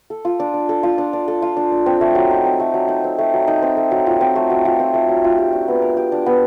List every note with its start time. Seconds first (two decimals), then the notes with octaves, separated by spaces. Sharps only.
0.10 A4
0.25 F4
0.40 D4
0.54 D4
0.69 A4
0.83 F4
0.98 D4
1.13 D4
1.28 A4
1.42 F4
1.57 D4
1.72 D4
1.86 C4
2.01 A3
2.15 F#3
2.31 D#4
2.45 C4
2.60 A3
2.74 F#3
2.88 D#4
3.04 C4
3.18 A3
3.33 F#3
3.47 D#4
3.62 C4
3.77 A3
3.91 F#3
4.06 F4
4.21 C4
4.35 A3
4.50 F#3
4.65 F4
4.80 C4
4.94 A3
5.09 F#3
5.24 F4
5.38 G4
5.53 D4
5.68 B3
5.82 A#4
5.97 G4
6.12 D4
6.26 B3